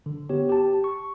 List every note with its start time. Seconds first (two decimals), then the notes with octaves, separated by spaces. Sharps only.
0.06 D3
0.29 B3 G4 C#5
0.49 G4 A5
0.84 C#6